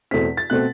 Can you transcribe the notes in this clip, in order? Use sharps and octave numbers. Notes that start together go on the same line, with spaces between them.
E2 B2 A3 C4 B6
A6
B2 A3 C4 F#6